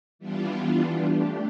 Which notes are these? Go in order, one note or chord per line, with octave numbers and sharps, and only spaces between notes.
E3 G3 B3 D4 F4
A3 D4 G4